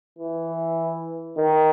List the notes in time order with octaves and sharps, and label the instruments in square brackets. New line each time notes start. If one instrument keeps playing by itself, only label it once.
[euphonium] E3
D#3